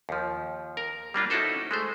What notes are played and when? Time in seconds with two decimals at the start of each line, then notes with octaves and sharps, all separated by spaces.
0.09 D#2 F3
0.77 A#4
1.14 G3 A#3 D4 F4
1.30 C#4 D#4 E4 F#4 A4 C5
1.71 G#3 A3 C5